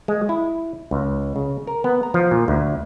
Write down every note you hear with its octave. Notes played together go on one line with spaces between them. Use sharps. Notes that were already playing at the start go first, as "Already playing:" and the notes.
G#3
E4
C#2
C#3
A#4
B3
A#5
F3
A#2
D2